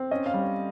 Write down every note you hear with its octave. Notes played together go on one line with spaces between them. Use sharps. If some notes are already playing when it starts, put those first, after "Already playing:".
Already playing: C4
C#4 D#5
F5
G3
C#5